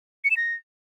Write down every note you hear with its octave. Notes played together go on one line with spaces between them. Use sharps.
C#7
E7
A#6